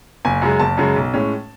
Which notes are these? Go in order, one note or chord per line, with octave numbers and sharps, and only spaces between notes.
F#1 G#5
F#2 C#3 G#3
F#1 A5
F#2 C#3 G#3
B1
A2 G#3 C#4